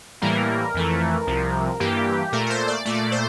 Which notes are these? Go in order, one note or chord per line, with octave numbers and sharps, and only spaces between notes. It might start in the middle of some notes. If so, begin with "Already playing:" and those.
A2 E3 G3 A#3 A#4
F2 E3 A3
C2 C3 F3
G2 E3 A#3 G4
A#2 A3 A#4
A#4
C5
D5
A#2 A3 D5
C5